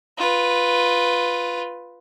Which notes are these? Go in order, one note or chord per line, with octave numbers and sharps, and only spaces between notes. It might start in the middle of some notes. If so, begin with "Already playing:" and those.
F4 B4